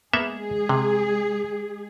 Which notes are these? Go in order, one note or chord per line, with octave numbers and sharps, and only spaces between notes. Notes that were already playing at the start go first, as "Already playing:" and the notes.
G#3 A#3 B3 G#4 E5
C3